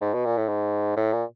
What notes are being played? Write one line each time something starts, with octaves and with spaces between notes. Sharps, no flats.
G#2
B2
A#2
A2
G#2
A2
A#2